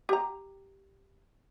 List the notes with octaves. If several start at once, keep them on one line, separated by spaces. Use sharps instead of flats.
G4 A#5